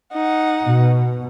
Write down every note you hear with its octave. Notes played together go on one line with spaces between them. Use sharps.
D#4 F#5
B2